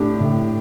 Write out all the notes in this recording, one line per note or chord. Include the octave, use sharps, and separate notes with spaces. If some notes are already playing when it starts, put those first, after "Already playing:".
Already playing: A2 D4 G4
A2